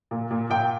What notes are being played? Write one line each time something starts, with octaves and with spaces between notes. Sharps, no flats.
A#2
A#2
A#2 G5